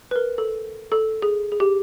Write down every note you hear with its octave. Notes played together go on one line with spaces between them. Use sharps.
B4
A#4
A4
A4
G#4
G#4
G4